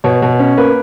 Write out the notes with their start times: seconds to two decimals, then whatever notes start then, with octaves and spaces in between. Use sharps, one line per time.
0.04 B2 C#5
0.22 B2
0.39 C#4
0.57 A#3 B4